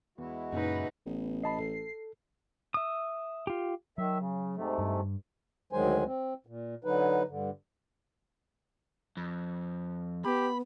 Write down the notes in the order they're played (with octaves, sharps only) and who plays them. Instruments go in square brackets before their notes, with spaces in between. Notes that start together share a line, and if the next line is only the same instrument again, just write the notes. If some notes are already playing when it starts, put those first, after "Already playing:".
[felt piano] E2 [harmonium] G#3 E4 F#4
[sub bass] F#2 [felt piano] A#2 C#3 [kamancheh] D#4 B4
[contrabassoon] A1 [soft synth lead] B3
[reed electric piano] D#5 A5 B5 [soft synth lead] C7
[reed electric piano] A4
[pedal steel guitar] E5 D#6
F4 G4
[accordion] D#3 E5 [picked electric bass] F#3
[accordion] C#3
G#2 C3 A3
[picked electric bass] G2
[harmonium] D2 D#3 F#3 G#3 C5 G#5
C4
A#2
D3 F#3 D#4 B4
G2 D3
[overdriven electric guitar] F2
[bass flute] B3 [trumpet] G4 [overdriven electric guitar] B5